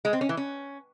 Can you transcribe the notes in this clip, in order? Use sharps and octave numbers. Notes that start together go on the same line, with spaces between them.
G#3
C4
C#4
E3
C#4